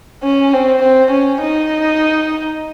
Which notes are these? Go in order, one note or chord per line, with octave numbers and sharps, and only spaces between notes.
C#4
C4
C4
C#4
D#4